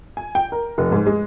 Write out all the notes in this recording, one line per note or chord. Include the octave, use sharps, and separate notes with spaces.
G#5
G5
A#4
F1
G#2
G#3